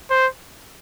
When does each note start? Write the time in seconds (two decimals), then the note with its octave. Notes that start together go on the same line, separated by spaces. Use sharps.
0.10 C5